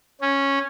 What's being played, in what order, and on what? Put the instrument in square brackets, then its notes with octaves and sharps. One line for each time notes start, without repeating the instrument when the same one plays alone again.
[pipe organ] C#4